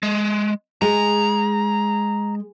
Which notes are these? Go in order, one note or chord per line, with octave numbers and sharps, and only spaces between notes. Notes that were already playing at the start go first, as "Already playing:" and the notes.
G#3
G#3 A#5